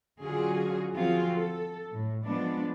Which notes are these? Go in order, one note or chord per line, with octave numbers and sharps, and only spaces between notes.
D3 F#3 C#4 F4 F#4 G#4
F3 C4 F4 F#4 G#4
A4
A2
F3 G#3 B3 D4